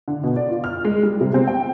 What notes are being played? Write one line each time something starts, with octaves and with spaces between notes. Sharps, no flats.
D3
B2
D5
F4
F6
G#3
G3
C3
C4
G5